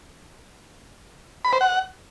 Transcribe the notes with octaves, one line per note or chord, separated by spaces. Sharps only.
B5
C5
F#5